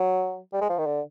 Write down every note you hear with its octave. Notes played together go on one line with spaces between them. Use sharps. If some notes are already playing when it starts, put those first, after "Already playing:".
Already playing: F#3
G3
G#3
F3
D#3
D3